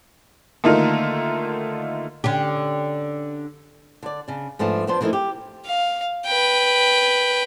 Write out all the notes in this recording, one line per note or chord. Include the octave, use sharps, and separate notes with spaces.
D3 D#3 A3 A#3 D#4 F4
D3 C#4 G4
D3 D5
C#3 D4
G#2 F3 A3 B3 D4
F3 B3 D4 F4 C5
E3 F3 A3 A#3 D#4 E4
G4
F5
B4 G5